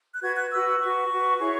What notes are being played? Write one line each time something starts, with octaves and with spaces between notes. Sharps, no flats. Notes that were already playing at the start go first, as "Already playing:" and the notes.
F#6
F#4 B4 G#6
F#6
F#4 B4 E6
F#4 B4 C#6
F#4 B4
E4 G#4 C#5